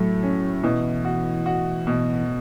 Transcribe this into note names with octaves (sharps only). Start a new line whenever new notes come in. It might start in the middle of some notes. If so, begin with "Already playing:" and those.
Already playing: A2 F#3 A3
C#4
B2 E3
F#4
F#4
B2